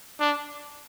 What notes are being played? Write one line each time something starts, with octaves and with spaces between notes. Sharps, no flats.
D4